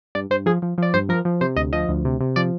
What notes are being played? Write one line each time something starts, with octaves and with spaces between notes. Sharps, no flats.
G2 D5
G2 C5
F3 G#4
F3
F3 D5
G2 C5
F3 A#4
F3
C3 C5
D2 D#5
F3 D#5
D2
C3
C3
F3 D5